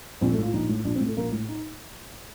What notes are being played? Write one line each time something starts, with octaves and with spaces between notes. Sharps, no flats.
A#1 C4
A3
A2
F4
A#1 D#4
A2
A#1 D4
C4
A2
A3
A#1 A#3
A2
D#4